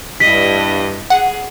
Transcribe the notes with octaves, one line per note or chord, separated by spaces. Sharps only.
G2 E4 D#5 B6
G#4 F#5